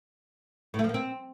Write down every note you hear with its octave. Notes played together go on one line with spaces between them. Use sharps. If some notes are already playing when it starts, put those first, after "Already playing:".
A2
A3
F3
A#3
C4